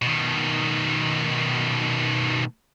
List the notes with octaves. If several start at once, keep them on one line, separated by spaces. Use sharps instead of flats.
B2 D#3